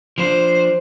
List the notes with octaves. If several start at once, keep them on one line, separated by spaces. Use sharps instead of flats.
F3 D4 C5